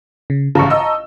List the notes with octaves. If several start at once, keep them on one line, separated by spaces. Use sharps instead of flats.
C#3
A1 C#3 A5 A#5 C#6
D#5 E6